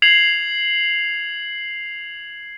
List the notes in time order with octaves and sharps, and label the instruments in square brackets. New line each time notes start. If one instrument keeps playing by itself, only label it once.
[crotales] G#6 C7 F7 F#7